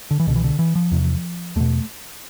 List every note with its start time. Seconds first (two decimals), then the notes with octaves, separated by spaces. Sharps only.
0.11 D3
0.20 E3
0.27 C2 B2 D3
0.36 E3
0.44 D3
0.59 E3
0.76 F3
0.91 E2 C3
1.56 E2 B2 A3